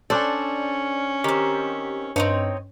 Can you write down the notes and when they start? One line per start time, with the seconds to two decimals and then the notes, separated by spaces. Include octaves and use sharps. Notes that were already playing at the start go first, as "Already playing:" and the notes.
0.10 C#4 D4 A4 C5 D5
1.24 D#3 C4 G4
2.16 G2 C4 D#4 C#5